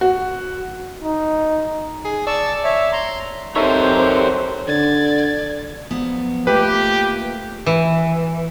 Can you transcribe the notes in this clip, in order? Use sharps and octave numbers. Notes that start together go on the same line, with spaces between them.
F#4
D#4
G#4
D5 A5 C#6 E6
C#5 E5
A#5 C6
C4 D#4 G4 A4 A#4 C5 C#5 E5
D3 D5 G#6 A6
F3 F#3 B3
A3 A#3 F4 G4 B4
E3